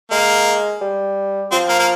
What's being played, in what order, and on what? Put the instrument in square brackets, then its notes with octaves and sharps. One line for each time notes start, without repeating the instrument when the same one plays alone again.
[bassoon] G#3 [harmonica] A#3
[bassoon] G3
[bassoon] F3 [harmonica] C4
[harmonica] A#3
A#3